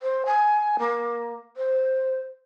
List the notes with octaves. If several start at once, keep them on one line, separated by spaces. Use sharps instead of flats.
C5
G#5
A#3
C5